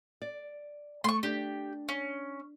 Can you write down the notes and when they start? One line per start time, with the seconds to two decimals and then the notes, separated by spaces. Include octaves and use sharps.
0.22 D5
1.04 A3 C6 C#6
1.23 D4 G4
1.89 C#4